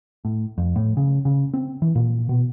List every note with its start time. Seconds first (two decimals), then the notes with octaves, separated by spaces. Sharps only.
0.25 A2
0.58 F2
0.76 A2
0.97 C#3
1.25 C#3
1.54 C4
1.82 E3
1.96 A#2
2.29 B2